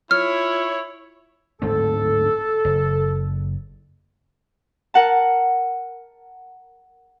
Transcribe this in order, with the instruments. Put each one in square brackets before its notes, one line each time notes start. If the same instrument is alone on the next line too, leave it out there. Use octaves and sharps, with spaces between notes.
[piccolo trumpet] E4 [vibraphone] F4 [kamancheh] C#5 [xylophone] F6
[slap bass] D1 G#2 C4 [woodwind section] A4
[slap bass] F#1
[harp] A#4 F#5 A5